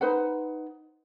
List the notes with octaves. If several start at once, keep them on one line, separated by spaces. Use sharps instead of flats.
D#4 B4 C5 F#5